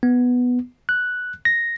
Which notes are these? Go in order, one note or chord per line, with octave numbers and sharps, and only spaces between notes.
B3
F#6
A#6